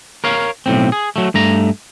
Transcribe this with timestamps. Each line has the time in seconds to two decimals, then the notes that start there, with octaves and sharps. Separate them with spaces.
0.24 A#4 C#5 F5
0.66 B1 A2 C4
0.92 G#4
1.16 F#3 A3
1.34 G2 A3 A#5